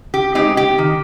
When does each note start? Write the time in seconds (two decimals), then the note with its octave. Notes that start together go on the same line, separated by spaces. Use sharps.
0.14 G4
0.35 G#3 C4 D#4 G4
0.57 G4
0.78 D#3